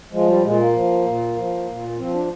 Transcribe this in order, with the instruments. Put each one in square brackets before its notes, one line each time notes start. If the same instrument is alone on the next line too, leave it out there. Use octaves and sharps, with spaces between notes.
[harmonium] F3 G#3
G3
A#2 G#3
A#3
F3
A#2
F3
A#2
F3 C4
D4